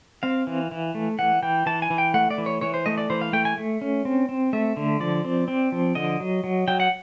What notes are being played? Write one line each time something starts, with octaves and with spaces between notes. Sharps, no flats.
C4 F5
E3
E3
A3
E3 F#5
E3 G5
E3 A5
G#5
E3
G5
A3 F#5
D5
E3
C#5
E3 C#5
C5
A3 D#5
D5
E3 C5
F5
A3 G5
G#5
A3
C#4
C4
C4
A3 E5
D3
F3 D5
C4
C4
F3
D3 D#5
F#3
F#3
F#3 G5
F#5